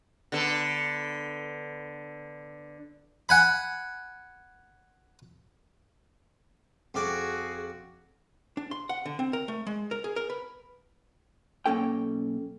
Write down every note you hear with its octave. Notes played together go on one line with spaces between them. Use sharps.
D3 B3 A4
F#5 G#5 B5
F2 F#4 G#4 D5
D4
C6
F#5
D3
C4
A#4
A3
G#3
A#4
G#4
A#4
B4
B1 A#3 C#4 A4 G5